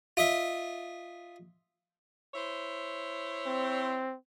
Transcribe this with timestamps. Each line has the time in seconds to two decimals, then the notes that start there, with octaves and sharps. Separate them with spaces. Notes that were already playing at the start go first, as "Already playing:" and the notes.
0.17 F4 D#5 E5
2.34 E4 C5 C#5
3.46 C4